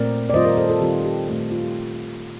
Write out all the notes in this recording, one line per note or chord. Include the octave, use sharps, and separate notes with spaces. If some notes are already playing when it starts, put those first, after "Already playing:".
Already playing: A#2 A3 C4 A#4 D5
D5
D#3 G3 C4 F4 C5 D#5
A#4 D5
A4 C5
F4 A4
D#3 G3 C4 F4 G4
G4
A#2 A3 C4 G4
G4
F4
G4